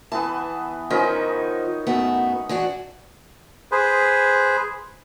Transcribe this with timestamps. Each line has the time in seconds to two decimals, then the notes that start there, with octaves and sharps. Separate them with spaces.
0.12 E3 B3 A5
0.90 D#3 F3 C#4 D#4
1.87 F#2 A3 B3
2.49 E3 D4 F#4
3.72 G#4 B4 C5